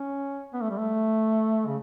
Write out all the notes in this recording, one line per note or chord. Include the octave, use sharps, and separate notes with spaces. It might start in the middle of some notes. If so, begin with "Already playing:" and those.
Already playing: C#4
B3
A3
G3
A3
C#3